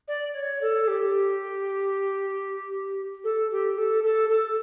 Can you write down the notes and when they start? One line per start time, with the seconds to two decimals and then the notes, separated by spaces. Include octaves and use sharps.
0.07 D5
0.34 C#5
0.61 A4
0.87 G4
3.23 A4
3.51 G4
3.77 A4
4.03 A4
4.29 A4